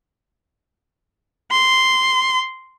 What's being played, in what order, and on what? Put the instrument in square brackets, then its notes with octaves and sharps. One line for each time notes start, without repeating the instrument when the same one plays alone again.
[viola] C6